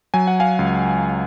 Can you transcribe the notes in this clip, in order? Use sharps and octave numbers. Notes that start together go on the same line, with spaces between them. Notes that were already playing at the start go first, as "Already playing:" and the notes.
F#3 G#5
F#5
F5 G#5
C#2